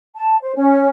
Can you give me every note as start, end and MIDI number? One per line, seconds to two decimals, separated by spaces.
0.15 0.36 81
0.43 0.54 72
0.55 0.90 61